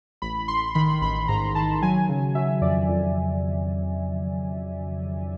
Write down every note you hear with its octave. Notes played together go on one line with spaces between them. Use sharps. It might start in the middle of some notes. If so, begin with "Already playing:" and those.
A1 B5
A1 C6
D#3 B5
A1 B5
G#2 A#5
D#3 A5
F#3 G#5
C#3
F#3 E5
F2 D5
F2